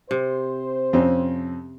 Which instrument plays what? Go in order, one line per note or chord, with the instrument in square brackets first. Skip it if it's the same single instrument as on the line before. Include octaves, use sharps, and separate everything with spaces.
[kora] C3 [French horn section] C5
[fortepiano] F2 C4 C#4